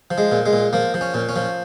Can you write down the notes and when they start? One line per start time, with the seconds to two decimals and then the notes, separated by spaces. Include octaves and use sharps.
0.11 F3
0.18 G#3
0.32 A#2
0.46 G#3
0.53 A#2
0.73 F3 A#3
0.94 F3
1.01 C#4
1.14 A#2
1.29 C#4
1.36 F3